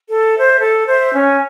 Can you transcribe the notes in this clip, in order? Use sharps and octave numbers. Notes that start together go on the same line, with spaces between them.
A4
C5 E5
A4
C5 E5
C#4